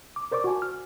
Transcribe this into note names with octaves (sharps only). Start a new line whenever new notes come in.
D6
A#4 C5 D5 C#6 D6
F#4 F#5 G#5 A5
F6